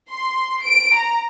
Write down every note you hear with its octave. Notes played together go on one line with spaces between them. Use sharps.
C6
D7
A#5